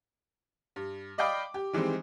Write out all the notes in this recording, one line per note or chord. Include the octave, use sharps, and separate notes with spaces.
G2
D5 D#5 F5 G5 B5 D6
G4
D#3 E3 G3 G#3 C4